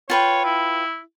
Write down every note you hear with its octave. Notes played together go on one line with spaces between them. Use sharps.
F4 B4 C#5 G5
E4